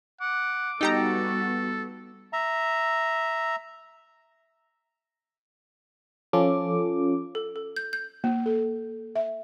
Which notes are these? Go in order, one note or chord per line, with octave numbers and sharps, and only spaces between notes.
F#5 D6
G3 B3 D#4 F#4 G4 A4 A#5
E5 A#5
F3 C#4 F4 A4 D6
A4
A4
G6
G6
A#3
A4
E5